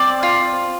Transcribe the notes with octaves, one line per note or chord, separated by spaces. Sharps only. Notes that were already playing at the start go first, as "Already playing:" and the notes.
Already playing: C4 D5
F4